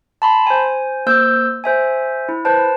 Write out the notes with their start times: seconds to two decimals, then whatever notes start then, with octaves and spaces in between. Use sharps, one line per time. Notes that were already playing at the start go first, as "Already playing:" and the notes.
0.22 A5 B5 C6
0.46 C5 G#5
1.06 A#3 C5 E6 G6
1.64 C5 E5 G#5
2.29 E4
2.45 B4 C5 A5